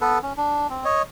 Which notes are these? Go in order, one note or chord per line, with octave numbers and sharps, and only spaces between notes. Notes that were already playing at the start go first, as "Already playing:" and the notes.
B3 A4 B4
C#4
D4
C4
C#5 D#5